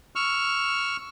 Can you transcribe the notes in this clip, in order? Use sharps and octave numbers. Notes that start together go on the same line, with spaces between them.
C#6 E6 F6